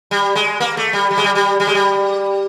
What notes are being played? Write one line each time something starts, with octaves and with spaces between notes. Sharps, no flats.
G3
G#3
A#3
A3
G3
G3
G#3
G3
G3
G3
G#3
G3